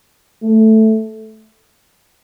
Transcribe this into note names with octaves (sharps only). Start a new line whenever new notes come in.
A3